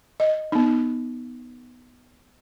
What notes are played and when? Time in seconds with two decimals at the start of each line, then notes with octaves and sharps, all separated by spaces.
0.20 D#5
0.52 B3 D#4